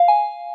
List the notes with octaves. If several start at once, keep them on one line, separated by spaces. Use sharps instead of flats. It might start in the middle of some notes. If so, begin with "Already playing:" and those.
Already playing: F5
G#5